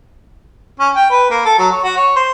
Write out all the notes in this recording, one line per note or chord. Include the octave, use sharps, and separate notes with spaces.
C#4
G5
B4
A#3
A4
F#3
C#5
F#4
C#5
C5